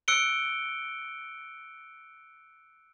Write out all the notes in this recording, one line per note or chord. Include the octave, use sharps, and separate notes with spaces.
E6 F#6 C#7 D7 G7